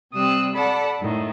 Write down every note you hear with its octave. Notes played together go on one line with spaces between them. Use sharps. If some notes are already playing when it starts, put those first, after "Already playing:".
C3 G3 C4 D#6 E6 F#6
A4 D5 F#5 A5 B5
F#2 A2 D#3